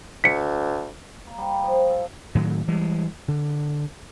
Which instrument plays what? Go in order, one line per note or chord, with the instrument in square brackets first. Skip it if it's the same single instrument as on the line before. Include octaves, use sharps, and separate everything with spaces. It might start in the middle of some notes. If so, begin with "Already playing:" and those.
[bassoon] D2 [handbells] B6 C#7
[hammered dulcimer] A#3
G3
F3
A4
[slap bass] A2 D#3 F#3
E3 G3 G#3
D3